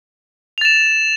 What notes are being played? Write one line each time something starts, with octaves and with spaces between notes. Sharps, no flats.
A6 E7 F7